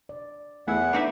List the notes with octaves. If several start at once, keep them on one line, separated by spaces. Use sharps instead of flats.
D5
E2 A3 B3 E4 G#4 A4 F#5
D4 D#4 B4 E5